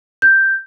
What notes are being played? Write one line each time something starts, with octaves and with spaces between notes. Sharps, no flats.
G6